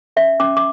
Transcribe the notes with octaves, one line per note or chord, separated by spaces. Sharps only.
C#4 E5
C#4 D6
D6